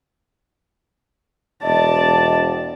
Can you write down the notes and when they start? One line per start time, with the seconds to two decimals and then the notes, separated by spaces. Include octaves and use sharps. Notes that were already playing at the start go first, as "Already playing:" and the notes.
1.63 E1 D5 D#5 A5